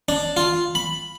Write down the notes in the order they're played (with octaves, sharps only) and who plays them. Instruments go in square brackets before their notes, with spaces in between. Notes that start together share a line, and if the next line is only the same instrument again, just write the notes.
[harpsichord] D4
F4
B5